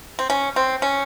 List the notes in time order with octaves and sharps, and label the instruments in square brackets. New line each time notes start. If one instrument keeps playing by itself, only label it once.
[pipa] C4
C#4
C4
C#4